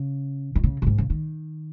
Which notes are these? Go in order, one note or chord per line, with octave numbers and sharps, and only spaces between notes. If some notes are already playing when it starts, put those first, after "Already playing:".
Already playing: C#3
D#3
C#3
A#2
G#2
C#3
D#3